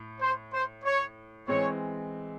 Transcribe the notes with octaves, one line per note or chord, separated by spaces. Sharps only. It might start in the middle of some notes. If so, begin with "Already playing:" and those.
Already playing: A2
C5
C5
C#5
E3 G#3 C4 C#5